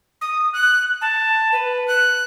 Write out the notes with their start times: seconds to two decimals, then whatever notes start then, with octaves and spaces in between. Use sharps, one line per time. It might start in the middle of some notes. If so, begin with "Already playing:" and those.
0.21 D#6
0.53 F#6
1.01 A5
1.52 B4
1.88 F#6